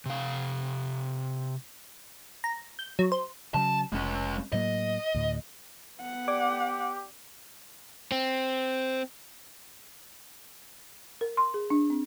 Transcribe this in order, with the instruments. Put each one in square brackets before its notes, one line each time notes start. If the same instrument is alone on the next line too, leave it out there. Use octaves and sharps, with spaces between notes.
[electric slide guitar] C3 F5
[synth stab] A#5
G6
F#3
C5
[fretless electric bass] C#3 F#3 [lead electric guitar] A5
[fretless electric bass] F1 [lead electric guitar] G#3 C#4
[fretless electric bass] A2 F#3 A#3 [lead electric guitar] D#5
[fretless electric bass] D2 A2
[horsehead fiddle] B3 F#5
[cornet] G4 [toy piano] D5 [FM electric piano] D6
[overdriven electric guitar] C4
[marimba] A#4
C6
G#4
D4
C4